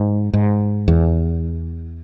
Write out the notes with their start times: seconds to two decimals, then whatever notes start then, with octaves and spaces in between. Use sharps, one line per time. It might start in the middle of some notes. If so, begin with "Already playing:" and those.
Already playing: G#2
0.33 G#2
0.88 E2